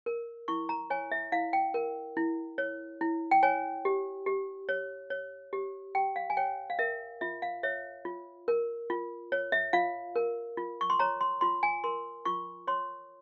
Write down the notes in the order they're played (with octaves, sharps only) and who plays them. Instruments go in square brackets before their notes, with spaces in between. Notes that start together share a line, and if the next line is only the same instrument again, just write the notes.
[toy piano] A#4
E4 C#6
A#5
C#5 G#5
E5
E4 F5
G5
A#4
E4
C#5
E4
G5
C#5 G#5
G4
G4
C#5
C#5
G4
G4 G5
F5
G#5
C#5 G5
F5
A#4 E5
F4 E5
F5
C#5 E5
F4
A#4
F4
C#5
E5
F4 F5
A#4
F4
C#6
C6
C#5 A#5
C6
F4 C6
G#5
A#4 C6
F4 C#6
C#5 C6